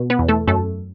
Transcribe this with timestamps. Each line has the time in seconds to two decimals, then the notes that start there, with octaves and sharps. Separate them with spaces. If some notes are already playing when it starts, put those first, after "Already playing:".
Already playing: B2
0.10 B3 B4
0.19 E2
0.29 A3 A4
0.47 F#2 A3 A4